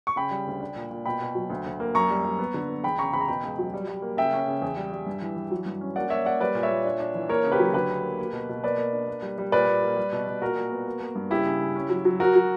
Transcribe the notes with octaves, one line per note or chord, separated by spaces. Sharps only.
C#6
C#3 G5 B5
G3
D2
D4
A#2
A#2
B2 G5 B5
B2
F#3
D2
D2
A#3
F#2 A#5 C#6
G3
G3
B3
D3
B3
E2 G5 B5
C#3 A#5 C#6
E2 B5
A#5
B2 G5 B5
C#2
F#3
G3
G3
A#3
C#3 E5 G5
C#4
C#3
E2
G3
G3
G2
E3
E3
F#3
G2
C#4
A#3 D5 F#5
A#3 C#5 E5
A#3 D5 F#5
G3 B4 D5
A#2
C#5 E5
A#2
D4
D4
E3
A#3 A#4 C#5
C#3
G4 B4
F#3
D3 G4 B4
D2
A#3
A#3
B2
B2
A#3 B4 D5
A#3
D4
A#3
G3
G3
A#2 B4 D5
A#2
A#3
G3
B2
B2
A#2 F#4 A#4
A#2
B3
A#3
A#3
G2
C#3 E4 G4
C#3
C#3
C#4
F#3
F#3
F#3 F#4 A#4
F#3